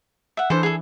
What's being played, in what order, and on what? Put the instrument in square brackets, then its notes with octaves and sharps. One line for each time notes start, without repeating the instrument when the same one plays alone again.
[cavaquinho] E5 F#5
[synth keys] E3 D4 [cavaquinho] A4 C5
[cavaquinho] G#4 A4